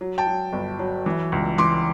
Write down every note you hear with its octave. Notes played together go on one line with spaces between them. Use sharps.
F#3
G5 A5
F#3
G1
F#3
E3
C#2
E3 C6 D6